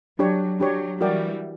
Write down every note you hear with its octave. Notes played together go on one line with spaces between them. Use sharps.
F#3 D4 G4 C#5
F#3 D4 G4 C#5
E3 G3 F#4 A#4 D5 G5